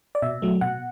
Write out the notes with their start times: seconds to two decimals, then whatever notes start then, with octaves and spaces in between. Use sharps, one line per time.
0.15 D5
0.22 B2 E5
0.42 F#3 A3
0.61 B2 F#5